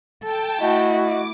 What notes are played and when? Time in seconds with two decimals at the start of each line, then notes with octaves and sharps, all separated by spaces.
0.24 A4 G5 A5
0.60 A3 E4 F#4 D#5
1.01 D6